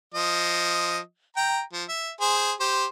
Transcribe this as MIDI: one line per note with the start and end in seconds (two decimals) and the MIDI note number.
0.14 0.98 53
0.14 0.98 75
1.37 1.61 79
1.37 1.61 82
1.73 1.84 53
1.89 2.11 76
2.21 2.52 68
2.21 2.52 72
2.61 2.86 67
2.61 2.86 72